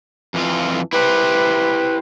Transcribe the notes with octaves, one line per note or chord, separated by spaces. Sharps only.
F2 E3 F4
E4 G4 B4 C5